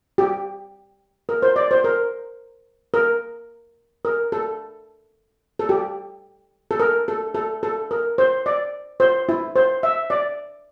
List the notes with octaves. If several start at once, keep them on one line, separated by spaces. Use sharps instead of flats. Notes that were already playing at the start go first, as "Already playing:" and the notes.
G4
A#4
C5
D5
C5
A#4
A#4
A#4
A4
A4
G4
A4
A#4
A4
A4
A4
A#4
C5
D5
C5
E4
C5
E5
D5